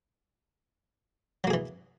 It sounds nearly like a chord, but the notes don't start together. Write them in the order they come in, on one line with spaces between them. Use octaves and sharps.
F#3 A#3 G#4 E3